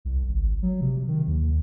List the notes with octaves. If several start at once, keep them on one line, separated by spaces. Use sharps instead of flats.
C2
G#1
F#3
C3
D#3
D#2